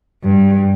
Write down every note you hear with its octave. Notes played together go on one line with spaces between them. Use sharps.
G2